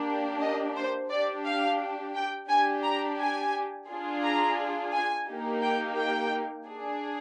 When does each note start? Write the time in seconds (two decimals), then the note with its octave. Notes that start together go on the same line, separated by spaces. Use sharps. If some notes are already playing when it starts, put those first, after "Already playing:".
Already playing: A#3 D4 G4
0.41 D#5
0.76 C5
1.10 D4 G4 D5
1.45 F5
2.15 G5
2.49 D4 G4 G#5
2.84 A#5
3.19 G#5
3.88 D4 F4 G#4
4.23 A#5
4.92 G#5
5.27 A#3 D#4 G4
5.62 G5
5.97 G5
6.66 D4 G#4